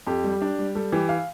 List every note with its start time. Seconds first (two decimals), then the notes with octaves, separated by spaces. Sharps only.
0.07 F2 G4
0.24 G3
0.42 D4
0.59 G3
0.75 G3 A4
0.92 E3 G4
1.09 F5